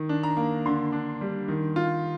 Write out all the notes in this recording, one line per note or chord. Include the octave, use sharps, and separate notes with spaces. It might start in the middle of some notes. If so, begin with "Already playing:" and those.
Already playing: D#3
D4
A#5
A#3
D3 C6
D4
G3
D#3
F4